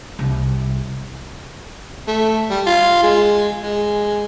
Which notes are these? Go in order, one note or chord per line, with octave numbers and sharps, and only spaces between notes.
C2
A3
G3
F4
G#3
G#3